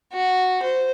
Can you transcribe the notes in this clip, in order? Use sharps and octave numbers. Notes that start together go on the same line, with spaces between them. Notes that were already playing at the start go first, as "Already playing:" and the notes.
F#4
C5